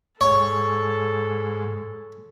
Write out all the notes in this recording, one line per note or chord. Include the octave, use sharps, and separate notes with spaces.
G#2 A4 C#5